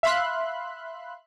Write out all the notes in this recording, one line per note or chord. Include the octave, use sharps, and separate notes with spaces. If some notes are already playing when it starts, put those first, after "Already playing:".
E5 F5 B5 C6 F#6